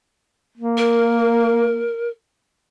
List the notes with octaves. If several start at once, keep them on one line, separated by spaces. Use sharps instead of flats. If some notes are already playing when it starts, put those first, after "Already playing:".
A#3
A#4